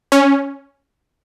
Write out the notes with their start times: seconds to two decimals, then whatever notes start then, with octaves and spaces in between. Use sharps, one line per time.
0.12 C#4